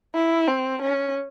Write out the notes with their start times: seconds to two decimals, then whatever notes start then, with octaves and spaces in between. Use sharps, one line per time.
0.15 E4
0.48 C4
0.82 C#4